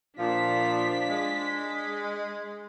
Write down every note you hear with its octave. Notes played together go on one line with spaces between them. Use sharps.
A#2 F3 D4 B6
G#3